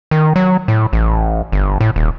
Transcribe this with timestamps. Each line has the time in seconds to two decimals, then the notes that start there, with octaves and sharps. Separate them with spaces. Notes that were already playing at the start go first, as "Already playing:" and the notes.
0.11 D#3
0.36 F#3
0.68 A2
0.93 A1
1.52 G1
1.81 A2
1.96 D#1